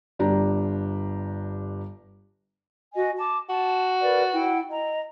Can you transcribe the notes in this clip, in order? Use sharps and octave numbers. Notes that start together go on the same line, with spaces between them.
G1 D4 G4 A#5
F#4 D#5 G#5
A5 D6
F#4 A5
A#4 B4 D5
E4 F#5 G5
D#5 A#5